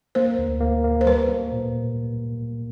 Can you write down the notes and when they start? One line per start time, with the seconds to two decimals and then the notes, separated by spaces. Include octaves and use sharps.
0.15 A#3 C5
0.39 D2
0.61 A#3
0.84 A#3
1.01 C5
1.06 G3 B4
1.29 A#3
1.52 A#2